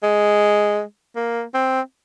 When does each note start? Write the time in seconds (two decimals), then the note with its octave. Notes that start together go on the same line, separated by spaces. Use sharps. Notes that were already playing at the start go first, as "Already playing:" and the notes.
0.03 G#3
1.16 A#3
1.54 C4